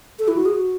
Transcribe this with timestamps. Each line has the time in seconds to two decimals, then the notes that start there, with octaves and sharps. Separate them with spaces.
0.19 A4
0.28 E4
0.37 F#4
0.46 G#4
0.54 F#4